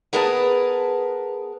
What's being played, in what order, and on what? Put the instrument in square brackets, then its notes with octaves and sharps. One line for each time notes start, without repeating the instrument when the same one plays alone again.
[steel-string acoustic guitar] B3 G#4 A#4 B4 F#5 A5